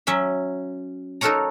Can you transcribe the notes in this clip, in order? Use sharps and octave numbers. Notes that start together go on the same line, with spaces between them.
F#3 C#4 E5
D#4 F#4 A4 A#4 C#5 A#5